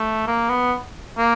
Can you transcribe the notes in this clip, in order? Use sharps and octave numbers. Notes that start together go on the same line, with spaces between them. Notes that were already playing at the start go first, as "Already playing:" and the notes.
Already playing: A3
A#3
B3
A#3